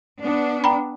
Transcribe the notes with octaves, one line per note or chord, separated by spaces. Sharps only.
B3 D4
G5 A#5 B5